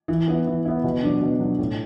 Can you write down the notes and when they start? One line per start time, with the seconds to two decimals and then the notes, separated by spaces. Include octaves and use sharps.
0.08 E3
0.28 B3 E4
0.47 E3
0.65 B3 E4
0.84 B2
1.03 F#3 D4
1.21 B2
1.40 F#3 D4
1.58 A2